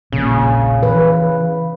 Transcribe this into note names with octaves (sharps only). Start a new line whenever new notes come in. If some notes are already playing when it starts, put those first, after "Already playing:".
E1 A#1 A#2 C#3
E3 B4